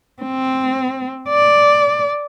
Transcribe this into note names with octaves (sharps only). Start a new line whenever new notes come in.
C4
D5